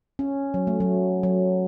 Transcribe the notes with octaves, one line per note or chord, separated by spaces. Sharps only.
C#4
F#3
A3
F#3
F#3